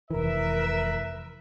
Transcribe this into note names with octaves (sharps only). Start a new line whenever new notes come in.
F1 E3 A#4 B4 E5